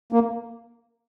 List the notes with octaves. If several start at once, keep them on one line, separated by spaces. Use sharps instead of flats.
A#3